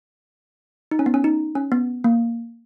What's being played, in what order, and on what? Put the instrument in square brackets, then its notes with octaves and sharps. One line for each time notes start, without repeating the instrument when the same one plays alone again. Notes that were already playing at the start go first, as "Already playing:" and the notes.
[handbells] D#4
C#4
B3
C#4
D#4
C#4
B3
A#3